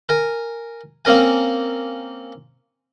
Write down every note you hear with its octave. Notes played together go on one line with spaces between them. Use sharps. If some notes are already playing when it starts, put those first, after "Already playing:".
A#4 G#5
A#3 C4 C#4 A#4 G#5